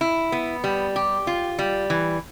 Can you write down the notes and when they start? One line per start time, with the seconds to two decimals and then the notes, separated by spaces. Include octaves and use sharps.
0.01 E4
0.32 B3
0.64 G3
0.96 G4
1.27 F4
1.59 G3
1.90 E3